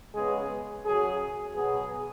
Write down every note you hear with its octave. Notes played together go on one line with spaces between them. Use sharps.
C#3 G#3 B3 G#4
F#2 C#3 F#3 G#4
B2 F#3 B3 G#4